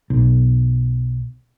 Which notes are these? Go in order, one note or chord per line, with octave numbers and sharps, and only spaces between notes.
B1